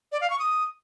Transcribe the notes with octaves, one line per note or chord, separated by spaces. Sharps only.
D5
F5
C#6
D#6